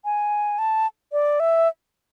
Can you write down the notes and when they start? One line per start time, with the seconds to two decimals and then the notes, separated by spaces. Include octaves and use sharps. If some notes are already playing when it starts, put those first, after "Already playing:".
0.05 G#5
0.59 A5
1.12 D5
1.40 E5